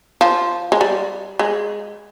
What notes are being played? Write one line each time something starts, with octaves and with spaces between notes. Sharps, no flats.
F3
G#3
G3
G#3